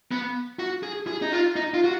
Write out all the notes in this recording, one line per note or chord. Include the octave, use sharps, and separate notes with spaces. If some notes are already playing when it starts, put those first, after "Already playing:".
B3
F#4
G#4
G#4
D#4
F4
D#4
F4
F#4